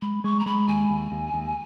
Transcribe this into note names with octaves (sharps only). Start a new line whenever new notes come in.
G#3 B5
G#3 C#6
A#5
G#3 B5
D#2 G#5
D#2
D#2
D#2